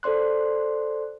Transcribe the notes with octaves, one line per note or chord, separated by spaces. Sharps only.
A4 C5 D5 C6 F#6